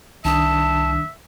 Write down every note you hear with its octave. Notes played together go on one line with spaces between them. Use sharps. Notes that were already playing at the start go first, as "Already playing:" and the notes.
C2 D#3 D4 E5 A5 D#6